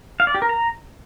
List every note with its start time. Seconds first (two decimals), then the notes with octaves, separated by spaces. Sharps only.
0.20 F5
0.27 D5
0.35 G4
0.42 A#4
0.49 A#5